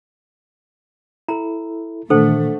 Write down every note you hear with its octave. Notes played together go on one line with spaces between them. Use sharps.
E4 A4 A#5
A#2 D#3 E3 A3 D4 A4 C5 F#5